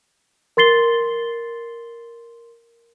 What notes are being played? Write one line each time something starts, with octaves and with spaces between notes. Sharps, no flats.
A#4 C6 A6 C7 G7